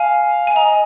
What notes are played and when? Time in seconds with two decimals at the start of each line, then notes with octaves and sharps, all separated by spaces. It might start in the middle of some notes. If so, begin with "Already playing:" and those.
Already playing: F5 G#5
0.47 G#5
0.55 D#5 A#5